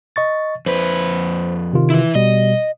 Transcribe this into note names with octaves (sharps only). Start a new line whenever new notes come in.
D#5 C#6 A6
F2 B4 C5
C3 D#3 F4
E3 E4
B2 G3 D#5